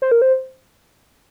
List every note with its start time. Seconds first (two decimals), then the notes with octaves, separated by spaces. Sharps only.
0.02 C5
0.12 A#4
0.22 C5